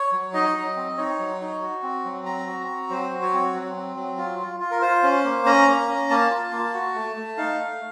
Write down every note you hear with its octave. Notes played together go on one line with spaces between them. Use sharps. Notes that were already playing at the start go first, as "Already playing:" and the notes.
Already playing: C#5
F#3
D#4 D#5
F#3
C4
D#4 C#5
F#3
D#4
F#4
C4
F#3
C4 A#5
F#4
C4
F#3 C5
F#4
C#5
C4
F#3
C4
F#3
F4
F4
F4
A#4
F4 C5
C#4
A#3
C#4 A#5
A#3
C#4
A#3 A5
F4
A#3
F#4
A3
A3
D#4 F5
A3